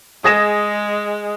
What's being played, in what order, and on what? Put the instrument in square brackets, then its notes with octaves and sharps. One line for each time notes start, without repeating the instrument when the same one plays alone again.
[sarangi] G#3 [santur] G#4 D#5 [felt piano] D#6 A#6 E7